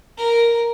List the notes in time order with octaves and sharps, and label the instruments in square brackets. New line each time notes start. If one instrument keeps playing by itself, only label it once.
[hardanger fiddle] A#4